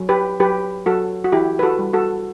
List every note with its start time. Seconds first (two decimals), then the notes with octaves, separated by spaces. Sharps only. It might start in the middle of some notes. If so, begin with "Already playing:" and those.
Already playing: F#3
0.09 G4 B4
0.40 F#3 G4 B4
0.86 F#3 F#4 A4
1.24 F#4
1.32 E3 E4 G4
1.59 B4
1.63 F#4 A4
1.79 G3
1.93 F#4 A4